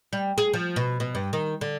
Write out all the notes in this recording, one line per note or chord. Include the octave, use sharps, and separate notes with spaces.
G3
G#4
F3
B2
B2
G2
D#3
D3